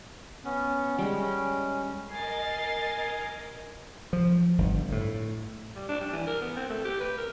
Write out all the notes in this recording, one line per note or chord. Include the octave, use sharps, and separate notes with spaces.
B3 C#4
G3 G#3
C#4
A#4 D#5 G#5 A6 C7
F3
G1
A2
G3
D4
G3
E3
A#4
B3
C4
A3
G4
B4
A#4